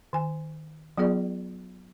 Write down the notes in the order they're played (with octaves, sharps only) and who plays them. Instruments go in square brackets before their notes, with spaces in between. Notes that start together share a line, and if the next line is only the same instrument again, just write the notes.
[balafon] D#3 G#5
F#3 B3 F4 G#4 D5